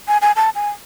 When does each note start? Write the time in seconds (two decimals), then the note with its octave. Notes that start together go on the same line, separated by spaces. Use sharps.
0.08 G#5
0.22 G#5
0.36 A5
0.55 G#5